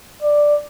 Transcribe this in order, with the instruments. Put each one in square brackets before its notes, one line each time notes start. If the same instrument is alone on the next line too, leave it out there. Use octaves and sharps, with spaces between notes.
[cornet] D5